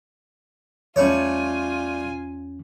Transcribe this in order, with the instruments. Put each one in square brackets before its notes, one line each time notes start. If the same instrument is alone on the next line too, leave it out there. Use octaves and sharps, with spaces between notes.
[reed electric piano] E2 C#4 [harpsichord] G3 A3 C#5 [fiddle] F4 G#5